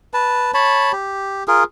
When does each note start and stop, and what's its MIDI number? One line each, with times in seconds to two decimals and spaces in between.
0.14 0.51 71
0.14 0.51 81
0.54 0.92 73
0.54 0.92 81
0.54 0.92 83
0.92 1.43 67
1.48 1.64 65
1.48 1.64 68
1.48 1.64 70